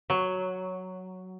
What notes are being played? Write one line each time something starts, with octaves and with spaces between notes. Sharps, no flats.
F#3